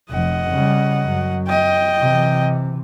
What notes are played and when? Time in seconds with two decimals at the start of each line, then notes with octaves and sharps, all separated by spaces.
0.11 F1 F3 D#5 F#5
0.50 C#3 G3
1.03 F#2 F#3
1.47 D#5 G5
2.01 C3 E3